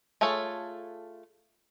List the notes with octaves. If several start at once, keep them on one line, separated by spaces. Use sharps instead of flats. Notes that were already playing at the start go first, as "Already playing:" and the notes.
A3 F4 G#4 A4 C#5